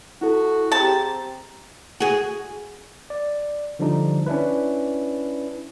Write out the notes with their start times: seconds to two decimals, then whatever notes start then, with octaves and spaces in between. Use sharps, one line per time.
0.21 E4 F#4 A4
0.72 C4 G4 G#4 A5 A#5
2.00 F#4 G#4
3.10 D5
3.79 D3 F3 G3 D4 D#4
4.26 C#4 D4 E4 B4